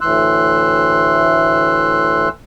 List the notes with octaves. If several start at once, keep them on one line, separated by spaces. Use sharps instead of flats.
D2 A2 E3 C6 E6 F#6